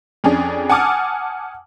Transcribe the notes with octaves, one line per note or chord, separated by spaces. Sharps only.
F2 C#4 D4 G#4
F#5 G#5 A5 D6 D#6 F6